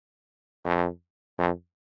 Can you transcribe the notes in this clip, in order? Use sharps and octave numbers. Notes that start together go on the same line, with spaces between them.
F2
F2